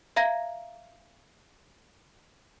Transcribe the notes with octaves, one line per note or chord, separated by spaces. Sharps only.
E5 F5 A#5 G#6 A#6